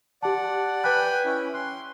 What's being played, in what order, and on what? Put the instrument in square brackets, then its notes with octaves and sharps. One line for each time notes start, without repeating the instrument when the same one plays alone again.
[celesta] G4 A5 [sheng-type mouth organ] D5 F#5
[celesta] B4 F#6 [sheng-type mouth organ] G5 G#5 B5
[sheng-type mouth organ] C#4 E4
[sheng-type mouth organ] C6 [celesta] F#6